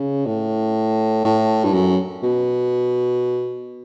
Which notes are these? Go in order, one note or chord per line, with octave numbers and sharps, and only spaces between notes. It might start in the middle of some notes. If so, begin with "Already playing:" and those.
Already playing: C#3
A2
A2
G2
F#2
B2